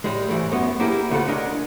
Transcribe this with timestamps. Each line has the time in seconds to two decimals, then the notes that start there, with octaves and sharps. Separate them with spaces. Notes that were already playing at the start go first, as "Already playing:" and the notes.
0.04 A2 G3 G#3
0.29 G#2 E3 A3
0.52 F#2 A2 B3
0.80 A#3 E4 G4 G#4 B4
1.10 D2 C#3 F4 A4 F#5
1.28 C#4 D4 A#4 D#5